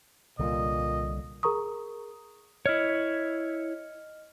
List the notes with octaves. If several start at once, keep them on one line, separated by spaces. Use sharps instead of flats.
C2 A#2 D3 G3 D#5
G#4 A#4 A#5 C#6 D#6
E4 C#5 D#5 F6